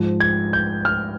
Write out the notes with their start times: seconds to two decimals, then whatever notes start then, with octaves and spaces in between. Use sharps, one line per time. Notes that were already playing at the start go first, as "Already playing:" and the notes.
Already playing: G#2 F3
0.20 G#6
0.53 G6
0.85 F6